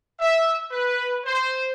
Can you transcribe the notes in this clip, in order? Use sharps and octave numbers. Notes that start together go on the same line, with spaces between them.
E5
B4
C5